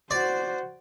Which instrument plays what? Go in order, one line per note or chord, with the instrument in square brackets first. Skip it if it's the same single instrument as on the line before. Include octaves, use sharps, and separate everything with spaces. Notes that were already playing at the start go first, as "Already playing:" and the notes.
[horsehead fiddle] F#4 C5 [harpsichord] D5